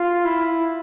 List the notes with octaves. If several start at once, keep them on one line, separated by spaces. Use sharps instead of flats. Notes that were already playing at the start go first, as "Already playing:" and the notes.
Already playing: F4
E4